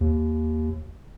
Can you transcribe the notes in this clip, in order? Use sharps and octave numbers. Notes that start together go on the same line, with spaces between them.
D#2